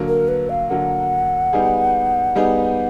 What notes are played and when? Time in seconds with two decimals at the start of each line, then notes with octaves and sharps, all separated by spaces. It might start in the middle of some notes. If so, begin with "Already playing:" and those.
Already playing: D3 F#3 A#3
0.08 A#4
0.28 B4
0.50 F5
0.70 D3 F#3 A#3 F#5
1.53 G3 B3 D#4 G#4
2.35 G3 B3 D#4 G#4